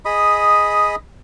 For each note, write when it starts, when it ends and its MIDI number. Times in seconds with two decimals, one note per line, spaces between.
0.05 0.96 68
0.05 0.96 75
0.05 0.96 83
0.05 0.96 87